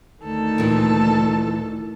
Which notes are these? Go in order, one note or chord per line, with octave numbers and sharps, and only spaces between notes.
D2 D#3 A4
A#2 E3